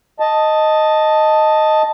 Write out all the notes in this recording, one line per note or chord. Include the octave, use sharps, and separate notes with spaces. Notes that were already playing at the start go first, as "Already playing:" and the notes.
D#5 A5